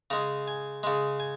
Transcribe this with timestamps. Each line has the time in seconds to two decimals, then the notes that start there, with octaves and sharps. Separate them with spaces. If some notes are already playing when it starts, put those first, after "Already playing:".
0.10 C#3 G#3 A#5
0.48 G#5
0.83 C#3 G#3
1.20 G#5